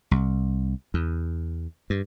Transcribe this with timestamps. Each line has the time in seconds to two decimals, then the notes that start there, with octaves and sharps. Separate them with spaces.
0.11 C2
0.94 E2
1.90 G2